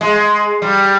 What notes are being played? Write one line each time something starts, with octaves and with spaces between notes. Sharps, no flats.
G#3
G3